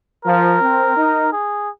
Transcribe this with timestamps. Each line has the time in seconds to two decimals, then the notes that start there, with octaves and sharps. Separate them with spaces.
0.25 F3 A#4
0.61 C4
0.97 D#4
1.32 G#4